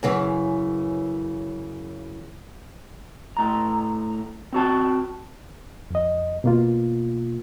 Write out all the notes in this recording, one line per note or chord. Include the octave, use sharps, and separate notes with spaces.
F#2 C#3 E3
A2 A#5
C4 F#4 A5
F2 D#5
B2 A#3 F4